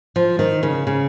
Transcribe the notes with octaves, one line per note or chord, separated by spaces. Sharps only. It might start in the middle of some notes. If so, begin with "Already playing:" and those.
F3
D#3
C#3
C#3